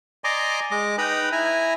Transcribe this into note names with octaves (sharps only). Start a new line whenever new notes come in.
D5 D#5 G#5 A#5 C6 D6
G#3 D#5 D6
D#4 B4 G5 A#5 B5 D#6
E4 E5 G#5 A#5